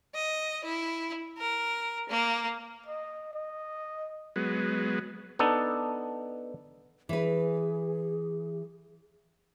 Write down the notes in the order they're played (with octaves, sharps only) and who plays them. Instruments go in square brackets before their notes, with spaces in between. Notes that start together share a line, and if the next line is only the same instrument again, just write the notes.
[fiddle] D#5
E4
A#4
A#3
[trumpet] D#5
D#5
[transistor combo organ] F#3 G#3 B3
[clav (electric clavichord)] B3 D4 D#4 A4
[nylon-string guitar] E3 B4 [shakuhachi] G#4